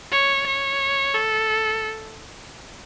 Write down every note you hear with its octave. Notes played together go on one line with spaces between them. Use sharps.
C#5
C#5
A4